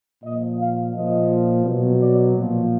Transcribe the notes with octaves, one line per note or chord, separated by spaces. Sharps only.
A#2 F3 D#5
F5
A#2 F3 D#5
B2 F#3
D5
A#2 F3